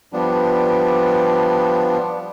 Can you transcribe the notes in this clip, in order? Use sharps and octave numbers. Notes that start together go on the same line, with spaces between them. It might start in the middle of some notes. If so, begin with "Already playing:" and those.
F3 G3 B3 D4